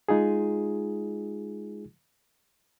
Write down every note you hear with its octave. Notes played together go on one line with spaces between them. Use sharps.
G#3 D#4 F4 G#4